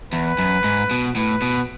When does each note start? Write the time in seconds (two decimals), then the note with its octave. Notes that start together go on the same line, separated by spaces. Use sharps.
0.13 E2 B4
0.39 F#2
0.64 G#2
0.91 B2
1.16 A2 B4
1.42 B2